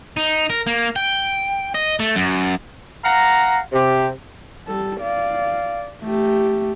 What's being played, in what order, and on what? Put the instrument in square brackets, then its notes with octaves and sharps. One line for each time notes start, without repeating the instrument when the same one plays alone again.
[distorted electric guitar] D#4
A#4
A#3
G5
D#5
A3
F#2
[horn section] F5 F#5 A#5
C3 G4
[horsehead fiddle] G3 A4
D5 F5
A3 G4